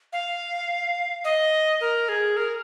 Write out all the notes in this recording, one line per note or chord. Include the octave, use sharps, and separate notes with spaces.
F5
D#5
A#4
G#4
A#4